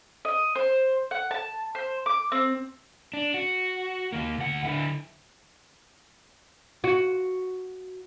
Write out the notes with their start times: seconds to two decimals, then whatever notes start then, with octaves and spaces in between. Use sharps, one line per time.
0.25 D#5
0.55 C5
1.11 F#5
1.31 A5
1.75 C5
2.06 D6
2.32 C4
3.14 D4
3.34 F#4
4.12 D#2 A#3
4.38 D2 F#5
4.65 D3 E4
6.84 F#4